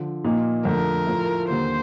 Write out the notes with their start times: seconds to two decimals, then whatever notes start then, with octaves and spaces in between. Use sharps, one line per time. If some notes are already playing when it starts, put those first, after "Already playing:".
Already playing: D3 F3
0.24 A#2 F3 A#3 D#4
0.65 F2 D3 A3 A#4
1.07 A2 F3 A3
1.49 D#2 D3 G3 A#3 C5